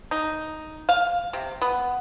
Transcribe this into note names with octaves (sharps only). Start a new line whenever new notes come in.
D#4
F5
C3
B3